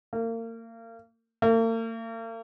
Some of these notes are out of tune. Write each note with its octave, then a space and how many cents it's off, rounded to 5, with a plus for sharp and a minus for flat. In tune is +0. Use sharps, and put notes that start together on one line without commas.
A#3 -35
A#3 -45